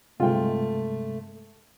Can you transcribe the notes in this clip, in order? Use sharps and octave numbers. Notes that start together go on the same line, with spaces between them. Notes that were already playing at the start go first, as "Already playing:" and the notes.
G2 C3 G#3 A3 F4 G5